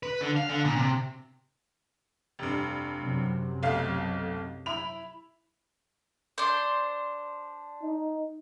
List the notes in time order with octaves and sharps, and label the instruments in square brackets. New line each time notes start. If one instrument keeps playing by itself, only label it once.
[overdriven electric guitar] B4
D3
F5
D3
A#2
C3
[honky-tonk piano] F1 G2
[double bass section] F#2 C3 F#3
[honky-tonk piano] B1 A3 F5
E4 B5 F7
[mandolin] D4 C5
[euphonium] D#4